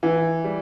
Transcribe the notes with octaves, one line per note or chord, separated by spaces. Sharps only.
E3
G3